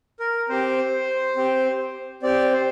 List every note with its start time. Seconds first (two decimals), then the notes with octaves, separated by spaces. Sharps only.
0.20 A#4
0.49 C4 G4 C5
1.37 C4 G4
2.23 C4 G4 D5
2.53 C5